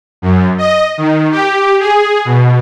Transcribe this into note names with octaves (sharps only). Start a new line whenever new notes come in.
F#2
D#5
D#3
G4
G#4
B2